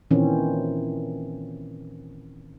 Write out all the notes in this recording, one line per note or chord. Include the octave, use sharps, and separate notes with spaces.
A#2 D#3 E3 C4 C#4